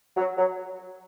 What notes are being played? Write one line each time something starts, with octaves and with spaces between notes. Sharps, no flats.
F#3
F#3